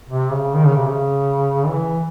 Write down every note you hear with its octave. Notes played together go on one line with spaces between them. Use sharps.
C3
C#3
D#3
C#3
C3
C#3
E3